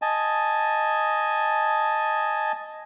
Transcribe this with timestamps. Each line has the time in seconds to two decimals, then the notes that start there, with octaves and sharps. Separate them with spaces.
0.02 D#5 G#5 A5